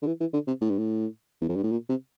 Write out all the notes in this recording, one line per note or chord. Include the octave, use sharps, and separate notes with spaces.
D3
E3
E3
D3
C3
A2
G2
A2
E2
F2
G2
A2
A#2
C3